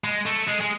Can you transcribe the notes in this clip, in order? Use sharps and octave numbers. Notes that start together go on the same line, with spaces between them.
G#3
A3
G#3
G#3